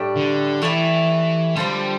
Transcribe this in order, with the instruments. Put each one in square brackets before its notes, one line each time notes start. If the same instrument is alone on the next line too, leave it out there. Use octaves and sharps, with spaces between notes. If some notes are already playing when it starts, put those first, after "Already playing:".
Already playing: [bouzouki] A2 G3 D4 G4
[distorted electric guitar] D3
[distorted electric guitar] E3 [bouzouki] A3 E4 G4 D5
[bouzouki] D3 F3 C4 [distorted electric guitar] G3